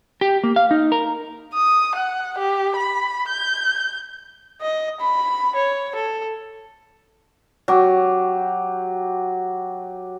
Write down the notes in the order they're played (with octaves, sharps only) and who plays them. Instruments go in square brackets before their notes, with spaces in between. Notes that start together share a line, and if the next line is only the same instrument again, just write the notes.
[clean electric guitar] G4
A#3
F5
D#4
A#4
[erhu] D#6
F#5
G4
B5
G6
[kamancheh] D#5
B5
C#5
A4
[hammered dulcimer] F#3 G4